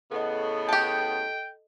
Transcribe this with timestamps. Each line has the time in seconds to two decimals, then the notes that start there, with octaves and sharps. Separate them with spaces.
0.12 A2 C#3 B3 A4 D#5
0.69 G4 G5 A5